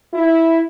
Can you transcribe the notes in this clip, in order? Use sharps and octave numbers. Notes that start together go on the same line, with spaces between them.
E4